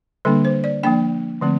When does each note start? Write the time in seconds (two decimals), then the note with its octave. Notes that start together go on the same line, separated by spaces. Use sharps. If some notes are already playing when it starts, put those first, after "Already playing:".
0.25 D3 G3 A#3 D4 A4
0.45 C5
0.64 D5
0.83 F3 A#3 D4 G5
1.41 D3 F3 A3 C4